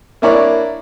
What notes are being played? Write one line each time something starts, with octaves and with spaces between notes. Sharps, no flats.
A#3 D4 E4 A#4 C#5 D5